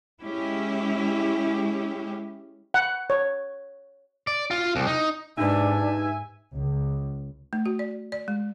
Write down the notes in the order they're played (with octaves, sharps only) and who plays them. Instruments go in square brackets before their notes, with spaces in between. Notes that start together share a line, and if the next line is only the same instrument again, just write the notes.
[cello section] G#3 C#4 E4 G4
[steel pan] F#5
C#5
[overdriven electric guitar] D5
F4
C2
D#4
[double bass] G#2 [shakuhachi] D4 [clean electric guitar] D#4 G4 B4 [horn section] E5 G#5
[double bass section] C#2
[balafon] A3
F#4
D5
D5
G#3